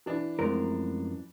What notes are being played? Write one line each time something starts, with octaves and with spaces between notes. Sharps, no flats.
E3 D4
F#2 F3 G#3 A3 C4 A#4